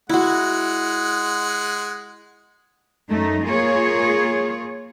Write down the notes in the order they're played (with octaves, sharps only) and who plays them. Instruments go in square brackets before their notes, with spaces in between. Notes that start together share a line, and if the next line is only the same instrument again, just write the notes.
[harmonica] G#3 F#5 [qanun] E4 F#4
[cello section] F#2 A3 D#4
A#3 F4 G#4 C#5